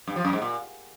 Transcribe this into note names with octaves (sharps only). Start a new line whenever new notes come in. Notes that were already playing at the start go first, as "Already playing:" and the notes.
G2
F3
F#2
G#2
A#2